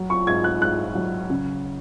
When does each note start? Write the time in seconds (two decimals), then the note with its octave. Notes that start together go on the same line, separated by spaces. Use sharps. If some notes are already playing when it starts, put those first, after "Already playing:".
Already playing: F#3
0.10 C#6
0.27 G#2 G#6
0.44 F#6
0.61 G#2 F#6
0.95 F#3
1.30 C#3